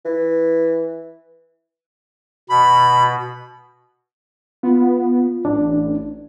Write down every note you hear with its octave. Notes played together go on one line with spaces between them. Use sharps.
E3
B2 B5
B3 F4
A1 D4